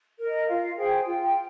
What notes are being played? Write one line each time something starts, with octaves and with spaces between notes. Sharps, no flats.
A#4
D#5
F4 F5
G#4 C5 G5
F4